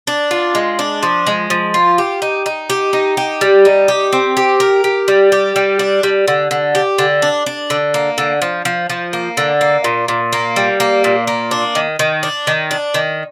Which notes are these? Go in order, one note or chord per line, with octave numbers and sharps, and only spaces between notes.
D4
F4
G#3
D4
F3
G#3
F3
F4
G4
D#4
D#4
G4
D#4
G4
G3
D#4
G4
C4
G4
A#4
G4
G3
G4
G3
D4
G3
D3
D3
G4
D3
D4
D4
D3
A#3
D3
F3
F3
F3
A#3
D3
A#3
A#2
A#2
A#3
G3
A#3
A#2
A#3
D4
D#3
D#3
D4
D#3
D4
D#3